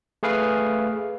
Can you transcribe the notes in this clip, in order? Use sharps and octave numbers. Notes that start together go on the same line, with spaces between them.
A3 G#4 B4 F5